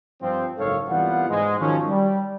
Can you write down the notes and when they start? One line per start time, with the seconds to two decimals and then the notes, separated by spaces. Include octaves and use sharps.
0.22 G2 F3 C4
0.58 F#1 G#2 A4 C#5 F5
0.89 C2 E3 G3 B3 F4 F#5
1.29 G#2 G#3
1.59 D#3 F3 F#3 C#4
1.89 G3